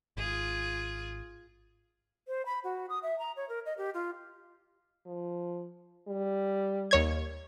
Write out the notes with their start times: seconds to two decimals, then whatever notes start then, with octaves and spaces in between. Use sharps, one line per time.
0.17 G#1 F4 G#4
2.28 C5
2.46 B5
2.64 F#4
2.90 D#6
3.03 E5
3.19 A#5
3.37 C#5
3.49 A#4
3.66 D#5
3.78 G4
3.94 F4
5.06 F3
6.08 G3
6.91 D#2 C#5 G#6